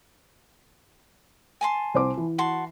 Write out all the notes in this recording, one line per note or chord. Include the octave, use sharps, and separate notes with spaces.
G#5 A5 C6
C2 C5 D6
E3
F#4 A5 C6